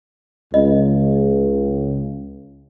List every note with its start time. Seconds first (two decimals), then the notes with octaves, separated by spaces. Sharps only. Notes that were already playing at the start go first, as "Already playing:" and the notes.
0.54 C#2 D#5